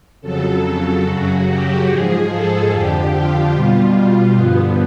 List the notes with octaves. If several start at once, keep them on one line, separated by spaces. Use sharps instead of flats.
F2 C#3 F#3 A4
F#2 C#3 F#3 F#4
G4
G#2 F3 G#4
A4
F2 D3 F3 G4
F4
B2 G3
G2 D3 F3 B3